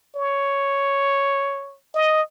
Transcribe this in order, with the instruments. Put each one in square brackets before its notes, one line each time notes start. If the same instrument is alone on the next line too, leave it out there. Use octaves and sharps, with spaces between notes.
[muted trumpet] C#5
D#5